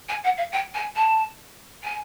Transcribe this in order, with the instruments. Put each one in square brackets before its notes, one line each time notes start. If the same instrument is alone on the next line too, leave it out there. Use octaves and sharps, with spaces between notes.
[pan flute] G#5
F#5
F5
G5
G#5
A5
G#5